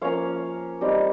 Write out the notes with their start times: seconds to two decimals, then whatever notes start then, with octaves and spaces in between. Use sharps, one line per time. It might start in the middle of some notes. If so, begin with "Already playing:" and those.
0.01 F3 A#3 C#4 C#5 F5
0.81 G3 C4 D#4